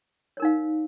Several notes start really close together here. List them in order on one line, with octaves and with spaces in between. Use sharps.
C#5 A#4 D#4 F5